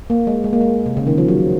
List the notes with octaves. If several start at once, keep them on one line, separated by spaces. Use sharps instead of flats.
A#3
G#3
G#3
A#3
G#3
C3
C#3
D#3
F3
F#3